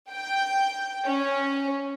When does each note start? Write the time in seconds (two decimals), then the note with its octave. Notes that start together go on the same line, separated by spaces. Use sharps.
0.11 G5
1.06 C#4